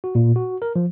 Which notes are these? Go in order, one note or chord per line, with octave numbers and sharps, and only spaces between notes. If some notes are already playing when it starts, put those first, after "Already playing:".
F#4
A#2
F#4
A#4
F3